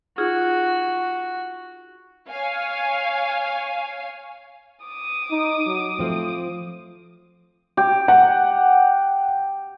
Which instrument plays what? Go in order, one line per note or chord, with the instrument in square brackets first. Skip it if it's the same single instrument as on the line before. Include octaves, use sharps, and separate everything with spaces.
[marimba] D#4 F4 G#4 [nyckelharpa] F#4
[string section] C#5 F5 G#5
[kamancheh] D6 D#6
[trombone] D#4
F#3
[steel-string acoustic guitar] F3 C4 [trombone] A3
[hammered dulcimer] G4
[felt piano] F#5